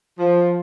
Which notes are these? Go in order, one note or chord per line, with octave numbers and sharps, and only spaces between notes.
F3